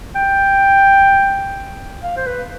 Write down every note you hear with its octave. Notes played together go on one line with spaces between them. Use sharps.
G5
F5
C5
B4